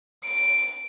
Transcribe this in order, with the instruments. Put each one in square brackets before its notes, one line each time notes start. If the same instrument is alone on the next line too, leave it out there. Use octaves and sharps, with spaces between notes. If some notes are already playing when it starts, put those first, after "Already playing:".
[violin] D7